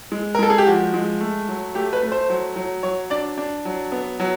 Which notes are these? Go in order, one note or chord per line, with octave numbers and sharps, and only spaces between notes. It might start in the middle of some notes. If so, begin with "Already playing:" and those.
G#3
A#4
G#3 A4
G#4
G4
F3 F#4
G#3
A3
F#3
A3 G4
B4
A3
C5
F#3
F#3
F#3 C#5
D4 D5
D4
F#3
B3
F#3